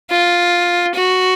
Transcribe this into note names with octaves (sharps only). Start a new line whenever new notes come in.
F4
F#4